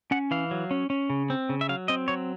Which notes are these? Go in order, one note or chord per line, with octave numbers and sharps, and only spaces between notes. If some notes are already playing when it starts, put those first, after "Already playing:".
C#4 F#5
E3 F5
F#3
C#4
C#4
C#3
C4
C#3
E5
F#3 F5
C4 D#5
F#3 C#5